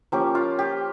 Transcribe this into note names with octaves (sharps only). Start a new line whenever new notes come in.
F3 A#3 C#4 G4
F4
G4